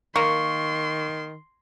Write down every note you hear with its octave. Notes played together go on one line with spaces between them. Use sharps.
D#3 A#3 C6 C#6